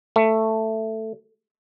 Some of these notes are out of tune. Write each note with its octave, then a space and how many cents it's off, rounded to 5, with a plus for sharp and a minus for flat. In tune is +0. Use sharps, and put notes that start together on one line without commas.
A3 +5